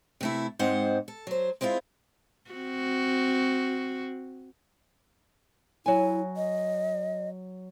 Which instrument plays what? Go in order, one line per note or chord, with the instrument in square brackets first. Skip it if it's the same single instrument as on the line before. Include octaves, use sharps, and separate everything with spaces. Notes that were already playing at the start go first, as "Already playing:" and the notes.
[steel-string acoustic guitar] C3 A3 E4
G#2 G#3 C4 C5 F#5
A4
F#3 C5
G#3 C4 D4 E4 F4
[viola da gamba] C4 F#4
[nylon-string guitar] F#3 G#5 [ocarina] E4
[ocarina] D#5